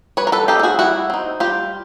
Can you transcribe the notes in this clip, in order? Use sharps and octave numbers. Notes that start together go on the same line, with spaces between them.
G3 B4 C#5
A#4
A4 B4
C4 D#4 G4 A4
A4
F#4 G#4
G3 E4 F#4
C4 D#4
G3 F4 G4